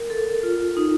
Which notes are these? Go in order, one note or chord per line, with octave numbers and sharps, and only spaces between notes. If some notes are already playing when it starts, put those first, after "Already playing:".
Already playing: A#4
A4
F4
D#4